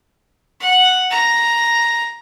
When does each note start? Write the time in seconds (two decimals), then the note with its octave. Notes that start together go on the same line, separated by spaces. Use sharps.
0.61 F#5
1.10 A#5